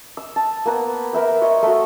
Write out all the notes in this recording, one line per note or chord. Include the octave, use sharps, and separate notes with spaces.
E6
A5
A#3 B3 B4 A#5
A#4 B4 E5 G5
C#5 D#5 E5 C6
A3 F#4